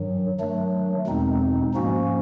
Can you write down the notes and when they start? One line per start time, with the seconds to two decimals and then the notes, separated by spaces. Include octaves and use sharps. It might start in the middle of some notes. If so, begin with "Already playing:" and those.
Already playing: G2 D#3 F#3
0.40 D#3 F#3 A3 D4
1.07 E2 B2 G#3 C4 D#4
1.74 G#2 F3 A#3 C#4 F#4